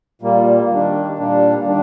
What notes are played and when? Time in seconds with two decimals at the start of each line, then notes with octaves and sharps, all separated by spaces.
0.22 A#2 G3 A#3
0.70 D#3 G3 D4
1.17 A#2 G3 A#3 D4
1.64 D#3 G3 D4